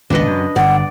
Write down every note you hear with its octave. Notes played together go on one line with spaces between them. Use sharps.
G#1 C#2 B2 D4 B4 D#5
F#2
G1 G2 D5 F#5